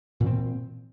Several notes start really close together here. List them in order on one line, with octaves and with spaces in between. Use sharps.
A#2 E3 C4